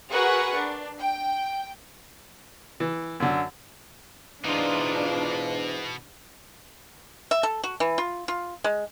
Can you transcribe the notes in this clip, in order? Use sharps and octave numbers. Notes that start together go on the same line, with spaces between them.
F#4 G#4 A#4 B4 F#5 C#6
D4
G5
E3
F#2 D3
G#2 B2 E3 D4 D#4 F4
E5
A4
F#4
E3
F4
F4
G#3